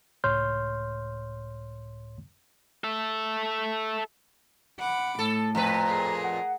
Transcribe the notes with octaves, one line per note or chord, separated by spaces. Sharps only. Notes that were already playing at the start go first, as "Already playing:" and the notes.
C#2 A2 C#5 C6 F6 G6
A4 E5
F#5 B5 D6
A2 A4
F2 A#2 B4 A#5
G#4 A#4
F#5